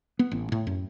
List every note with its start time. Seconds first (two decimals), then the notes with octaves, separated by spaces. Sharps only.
0.19 B3
0.32 A1
0.52 A2
0.67 F#2